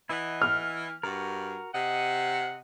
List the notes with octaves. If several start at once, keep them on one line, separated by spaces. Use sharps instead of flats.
E3 E4 D#5 F#5
F6
G2 F#4 A#4
C3 D#5 F#5